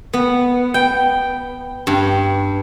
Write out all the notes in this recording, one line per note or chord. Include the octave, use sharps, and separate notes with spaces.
B3
G5
G2